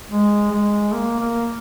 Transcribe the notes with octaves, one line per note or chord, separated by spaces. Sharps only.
G#3
G#3
A#3
A#3